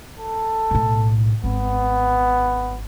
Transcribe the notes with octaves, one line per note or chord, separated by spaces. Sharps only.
A4
B1 A2
G#1 B3